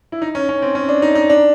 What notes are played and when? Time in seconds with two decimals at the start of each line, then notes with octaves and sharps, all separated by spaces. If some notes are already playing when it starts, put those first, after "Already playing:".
0.12 E4
0.22 D#4
0.35 C#4
0.49 C#4
0.62 C4
0.75 C#4
0.89 D4
1.02 D#4
1.15 D#4
1.30 D4